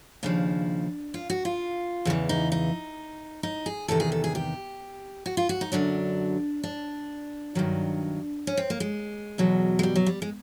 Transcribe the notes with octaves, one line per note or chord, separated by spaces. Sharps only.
D#2 C#3 F3 D4
F4
F#4
F4
E2 C#3 E3
D#4
D#4
D#4
G#4
E2 C3 D#3 A4
G#4
A4
G#4
G4
F#4
F4
F#4
D#4
F#2 D3 F#3 D4
D4
G2 D#3 F#3
C#4
C4
A#3
G#3
E2 B2 F#3
G#3
G3
F#3
G3
G#3